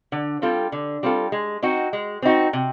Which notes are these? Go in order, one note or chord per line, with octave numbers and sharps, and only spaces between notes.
D3
G3 C4 F4 A4
D3
G3 C4 F4 A4
G#3
C4 D#4 F#4
G#3
C4 D#4 F#4
C3